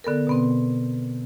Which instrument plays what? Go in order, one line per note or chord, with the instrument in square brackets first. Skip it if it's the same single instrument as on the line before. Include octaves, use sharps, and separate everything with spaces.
[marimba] D3 B3 A4 A#4
B2 B3 C4